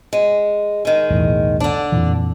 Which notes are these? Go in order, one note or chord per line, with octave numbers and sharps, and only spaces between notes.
G#3
D#3 G#3
B1 E2 A2
D3 D4
F2 A#2 E3